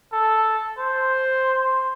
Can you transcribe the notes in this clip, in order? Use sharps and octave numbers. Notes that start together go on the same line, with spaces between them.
A4
C5